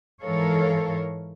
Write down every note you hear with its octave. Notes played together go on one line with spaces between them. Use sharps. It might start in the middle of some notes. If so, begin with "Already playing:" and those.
G#2 E3 A4 A#4 C#5 F5